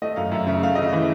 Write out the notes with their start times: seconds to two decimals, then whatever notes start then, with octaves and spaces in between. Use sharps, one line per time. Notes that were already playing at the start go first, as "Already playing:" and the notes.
0.02 A3 D#5
0.16 F#2 F5
0.32 F#2 E5
0.47 C#3 E5
0.63 A3 F5
0.75 C#3 D#5
0.83 E5
0.93 E3